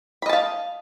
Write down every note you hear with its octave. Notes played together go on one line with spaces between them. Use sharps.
D#5 F5 A5 B5